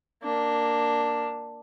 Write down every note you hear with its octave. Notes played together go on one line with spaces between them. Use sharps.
A#3 D4